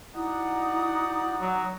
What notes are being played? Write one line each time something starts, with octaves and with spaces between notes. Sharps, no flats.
D#4 E4 F#4 D5 F#5 A#5 D#6
F#3